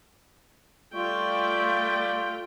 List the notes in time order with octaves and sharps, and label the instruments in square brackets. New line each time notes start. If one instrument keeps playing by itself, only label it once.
[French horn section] G3 D5 [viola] A3 G5 [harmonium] F4 [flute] C#6